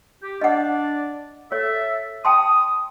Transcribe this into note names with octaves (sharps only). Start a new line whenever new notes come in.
G4
D4 D5 D#5 F#5
A4 C#5 E5
G5 A5 C6 D#6